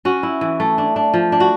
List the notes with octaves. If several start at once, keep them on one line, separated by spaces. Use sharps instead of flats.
C#4 F#4
E4
E3
A3
D4
D4
F3
D4
F#4